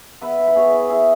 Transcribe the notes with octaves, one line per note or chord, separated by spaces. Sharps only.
B3 B4 E5
E4
B4
B3 G#4 C#5
E4
E4 G#4